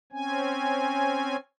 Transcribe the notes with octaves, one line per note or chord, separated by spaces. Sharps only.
C4 C#4 G#5